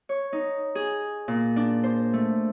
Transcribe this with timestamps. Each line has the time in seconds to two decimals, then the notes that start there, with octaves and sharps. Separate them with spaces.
0.09 C#5
0.33 D#4
0.75 G#4
1.28 A#2
1.56 D4
1.84 C5
2.13 A3